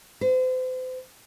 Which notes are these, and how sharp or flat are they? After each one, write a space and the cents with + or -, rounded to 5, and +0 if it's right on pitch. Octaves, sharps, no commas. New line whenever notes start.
C5 -40